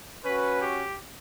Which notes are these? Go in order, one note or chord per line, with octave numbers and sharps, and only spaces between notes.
C#4 F#4 B4
G4